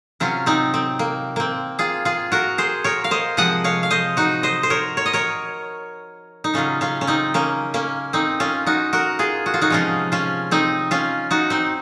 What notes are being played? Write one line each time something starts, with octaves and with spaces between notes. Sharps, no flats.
C3 F#3 C#4 F4
C4 D#4
C4
A#3
A#3 C4
F4 G#4
F4 G#4
F#4 A#4
G#4 C5
A#4 C#5
F5
C5 D#5
C3 F3 G#3 D#5 F#5
C#5 F5
F5
C5 D#5
D#4 F#4
C5 D#5
C5
A#4 C#5
C#5
D#5
A#4 C#5
D#4
C#3 F#3 C#4 F4
C#4 F4
C#4
C4 D#4
A#3 C#4
A#3 C#4
C4 D#4
C#4 F4
D#4 F#4
F#4 A#4
F4 G#4
F#4
F4
D#4 F#4
C3 F3 G#3 C#4 F4
C#4 F4
C4 D#4
C#4 F4
D#4 F#4
C4 D#4